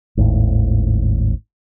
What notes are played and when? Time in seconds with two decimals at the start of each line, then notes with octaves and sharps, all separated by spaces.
0.17 G#1 D#2 A2